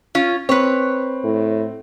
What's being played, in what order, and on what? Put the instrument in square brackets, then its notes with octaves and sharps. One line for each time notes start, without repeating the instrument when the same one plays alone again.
[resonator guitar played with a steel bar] C#4 F4
[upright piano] C4 [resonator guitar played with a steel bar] B4 C#5
[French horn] A2